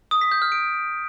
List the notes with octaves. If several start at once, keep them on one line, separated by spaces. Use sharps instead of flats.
D#6
B6
G6
F6
D7